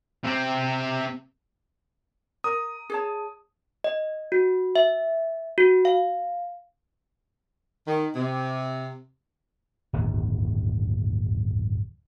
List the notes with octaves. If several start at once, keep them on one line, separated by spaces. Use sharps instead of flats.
C3 C4
A#4 D#6
G#4 C#5 A5
D#5
F#4
E5
F#4
F5
D#3
C3
D1 G1 D#2